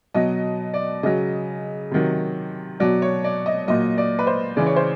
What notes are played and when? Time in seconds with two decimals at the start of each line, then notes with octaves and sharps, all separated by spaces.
0.14 B2 F#3 D#5
0.74 D5
1.03 C#3 F#3 D#5
1.91 C3 D#3 F#3
2.80 B2 F#3 D5
3.02 C#5
3.24 D5
3.46 D#5
3.68 A#2 F#3 D#5
3.98 D5
4.19 B4
4.27 C5
4.57 C#3 E3 D5
4.66 C#5
4.76 C5